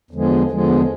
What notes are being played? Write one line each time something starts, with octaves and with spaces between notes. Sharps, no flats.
E2 D3 F3 G#3
E2 D3 F3 G#3